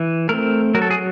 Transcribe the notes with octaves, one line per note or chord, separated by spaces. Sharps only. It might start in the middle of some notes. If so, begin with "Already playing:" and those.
Already playing: E3
A3 C4 A#4
F#3 A#4
A4
G#4